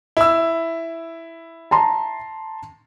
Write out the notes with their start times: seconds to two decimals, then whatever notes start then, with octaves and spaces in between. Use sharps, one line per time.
0.17 E4 E6
1.71 A5 A#5 C6